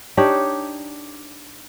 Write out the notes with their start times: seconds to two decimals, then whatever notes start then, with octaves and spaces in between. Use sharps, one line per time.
0.17 D4 D#4 G4 C#5